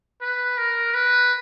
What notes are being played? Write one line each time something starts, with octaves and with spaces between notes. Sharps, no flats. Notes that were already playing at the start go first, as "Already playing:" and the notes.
B4
A#4
B4